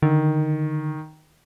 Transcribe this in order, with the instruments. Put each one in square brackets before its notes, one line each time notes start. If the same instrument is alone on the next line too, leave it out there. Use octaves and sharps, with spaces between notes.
[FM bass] D3 [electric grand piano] D#3